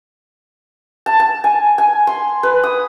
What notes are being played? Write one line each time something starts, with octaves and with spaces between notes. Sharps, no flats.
A5
A5
G#5
G#5
C6
B4
D#6